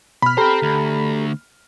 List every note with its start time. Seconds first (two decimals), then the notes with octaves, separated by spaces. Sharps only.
0.22 B2 B5 F6
0.37 G4 A4 C5 G5 A#5
0.62 D2